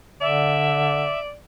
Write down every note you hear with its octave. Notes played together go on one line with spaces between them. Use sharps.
D3 D5 E5